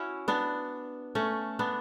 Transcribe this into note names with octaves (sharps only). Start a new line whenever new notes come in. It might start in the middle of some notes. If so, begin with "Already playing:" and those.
Already playing: C#4 E4 F#4
B3 D4
A3 C#4
B3 D4